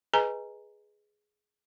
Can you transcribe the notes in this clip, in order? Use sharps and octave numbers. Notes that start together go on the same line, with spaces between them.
G#4 B4 D#5 G#5 A#5